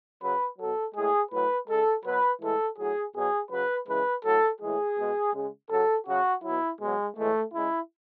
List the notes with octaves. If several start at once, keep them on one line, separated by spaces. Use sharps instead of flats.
C#3 F#3 B4
B2 F#3 A4
A2 G#3 G#4
A2 F#3 B4
C#3 G#3 A4
B2 F#3 B4
A2 E3 G#3 A4
A2 F#3 G#4
B2 F#3 G#4
C#3 F#3 B4
C#3 E3 G#3 B4
A2 F#3 A4
A2 E3 G#3 G#4
B2 G#3
C#3 G#3
C#3 F#3 A4
C#3 F#3 F#4
B2 F#3 E4
B2 F#3 G#3
A2 E3 G#3 A3
C#3 G#3 E4